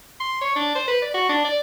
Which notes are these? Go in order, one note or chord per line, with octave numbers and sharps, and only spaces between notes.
C6
C#5
D4
C5
B4
D5
F#4
D4
D5